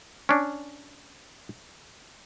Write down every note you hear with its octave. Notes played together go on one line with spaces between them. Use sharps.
C#4 D4